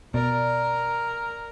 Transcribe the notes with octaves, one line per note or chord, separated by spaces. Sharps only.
B2 A#4 D5